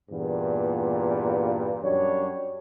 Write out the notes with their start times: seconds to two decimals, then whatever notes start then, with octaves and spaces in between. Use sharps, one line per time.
0.10 E2 G2 A#2
1.83 F#2 G3 D4 C#5